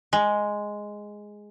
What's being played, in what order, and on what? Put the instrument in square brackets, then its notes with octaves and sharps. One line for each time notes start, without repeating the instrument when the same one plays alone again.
[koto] G#3